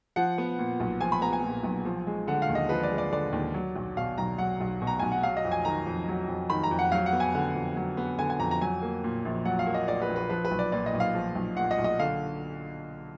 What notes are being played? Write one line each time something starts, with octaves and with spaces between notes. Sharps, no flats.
F3 F#5
B3
A#2
B1
F3 G#5
B5
B3 A#5
G#5
A#2
B1
F3
G#3
D3 F#5
F5
D#2
D#5
F3 B4
D5
G#3
D5
D3 D5
D#2
F#3
B1
B2 F5
B1 A#5
F#3 F#5
B1
B2
A#5
B1 G#5
F#5
F#3 F5
D#5
F2
G#5
D#3 A#5
F2
F#3
F2
D#3 B5
A#5
F2
F#5
F#3 F5
F#5
B3
G#5
D3 F#5
F2
F#3
B3
D3 G#5
G#5
F2 A#5
A#5
F#3 G#5
A#3
A#2
A#1
F#3 F#5
F5
A#3
D#5
A#2 D5
B4
A#1
B4
F3 B4
B4
B1
D5
A#2 D5
D#5
B1
F5
F3
B1
A#2 F#5
D#5
B1
D#5
D3 F5